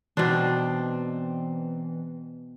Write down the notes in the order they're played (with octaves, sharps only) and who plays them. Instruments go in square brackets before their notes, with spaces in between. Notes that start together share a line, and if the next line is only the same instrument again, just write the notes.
[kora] B2 D4 [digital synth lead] E3 [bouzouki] C4 D#4